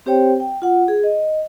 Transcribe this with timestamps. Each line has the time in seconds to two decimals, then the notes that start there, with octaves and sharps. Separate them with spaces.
0.06 C4 G4 C5 C#5 G5
0.40 G5
0.62 F4 F#5
0.88 G#4
1.04 D#5